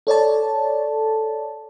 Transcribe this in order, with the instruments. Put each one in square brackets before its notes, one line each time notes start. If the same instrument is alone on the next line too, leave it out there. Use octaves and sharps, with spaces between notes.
[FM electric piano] A4 C#5 D5 A5